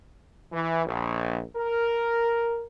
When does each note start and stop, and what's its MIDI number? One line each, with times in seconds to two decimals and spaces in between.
0.53 0.84 52
0.86 1.41 34
1.57 2.65 70